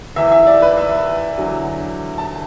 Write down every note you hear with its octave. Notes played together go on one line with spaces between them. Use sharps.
E2 E3 E5
E5
D5
B4
E5
E2 D3 F#3
A5